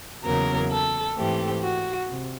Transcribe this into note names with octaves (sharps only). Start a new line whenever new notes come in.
E2 C#3 F#3 A#3 A#4
A4
G#2 E3 A3 C4 G4
F#4
C3